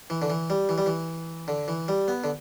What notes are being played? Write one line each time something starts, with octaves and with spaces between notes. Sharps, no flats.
E3
D3
E3
G3
E3
G3
E3
D3
E3
G3
B3
D3